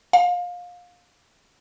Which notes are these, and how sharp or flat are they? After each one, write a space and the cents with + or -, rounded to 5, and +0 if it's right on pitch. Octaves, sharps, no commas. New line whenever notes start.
F5 +25